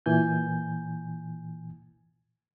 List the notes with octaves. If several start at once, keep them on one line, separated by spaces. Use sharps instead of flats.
A#2 E3 G#5 G6